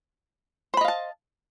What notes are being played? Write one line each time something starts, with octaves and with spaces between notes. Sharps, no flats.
C5 D#5 F5 A5 B5